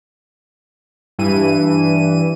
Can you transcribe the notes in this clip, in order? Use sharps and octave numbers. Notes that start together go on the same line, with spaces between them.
G2 E3 D#7